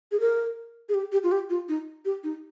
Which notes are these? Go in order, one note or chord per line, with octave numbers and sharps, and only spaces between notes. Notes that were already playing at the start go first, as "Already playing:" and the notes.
G#4
A#4
G#4
G4
G4
F4
G4
F4
D#4
G4
D#4